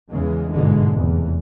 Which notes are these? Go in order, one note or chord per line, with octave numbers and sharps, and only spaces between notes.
E2 C#3 E3 G#3
G1 G#2 B2 D3 E3 G#3
F1 E2